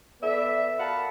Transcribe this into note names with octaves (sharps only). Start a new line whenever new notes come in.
B3 A4 D5 E5
A#4 F5 F#5 A5 B5